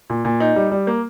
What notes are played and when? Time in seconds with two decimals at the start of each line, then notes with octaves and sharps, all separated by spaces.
0.10 A#2
0.25 A#2
0.40 D#4
0.56 G3
0.71 G3
0.87 A#3